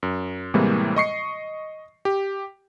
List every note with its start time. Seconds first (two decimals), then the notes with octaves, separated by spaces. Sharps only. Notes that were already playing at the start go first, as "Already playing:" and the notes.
0.03 F#2
0.54 A2 C3 E3 G3 G#3 A#3
0.96 D#5 C#6 C7 C#7
2.05 G4